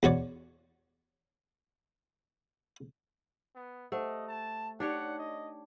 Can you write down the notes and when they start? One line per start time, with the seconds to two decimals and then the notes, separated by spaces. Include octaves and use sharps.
0.03 E2 F#4 C#5 D5
3.56 B3
3.92 A3 G4 C5 D#5 F#5
4.28 A5
4.80 D4 D#4 G4 C#5 D5 F#5
5.18 D#5